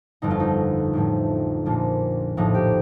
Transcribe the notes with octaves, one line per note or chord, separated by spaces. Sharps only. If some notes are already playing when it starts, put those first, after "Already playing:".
G1 F2 D3 D#4
F4
D#4
A1 A2 F3
A#1 A#2 F3
A#1 A2 F3 D#4
G4